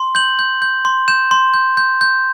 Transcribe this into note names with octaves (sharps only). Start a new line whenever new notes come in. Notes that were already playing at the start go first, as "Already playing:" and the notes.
Already playing: C6
G6 F#7
G6
G6
C6
G6 E7
C6
G6
G6
G6